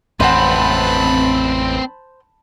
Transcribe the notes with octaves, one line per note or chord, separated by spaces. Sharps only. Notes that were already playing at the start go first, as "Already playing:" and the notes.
A1 F2 C4 B4 C5 F#5 A5 B5